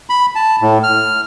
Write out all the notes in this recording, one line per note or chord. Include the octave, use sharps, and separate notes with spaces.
B5
A5
A2
F6